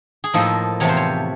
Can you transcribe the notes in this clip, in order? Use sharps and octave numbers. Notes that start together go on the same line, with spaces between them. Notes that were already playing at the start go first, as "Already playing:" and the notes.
G#4
A2 F3 A#3 D#4 A4
E2 C3 F3 A3 C#5
C5
C#5